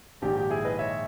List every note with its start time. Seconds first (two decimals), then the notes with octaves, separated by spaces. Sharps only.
0.22 A#1 G#2 D#3 G4
0.37 G4
0.50 E4 G#4
0.65 B4 D#5
0.79 C#5 E5